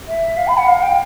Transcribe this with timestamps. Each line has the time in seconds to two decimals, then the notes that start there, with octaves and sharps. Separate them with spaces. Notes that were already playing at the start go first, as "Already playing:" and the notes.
0.08 E5
0.37 F5
0.48 B5
0.57 F#5
0.67 F5
0.82 G5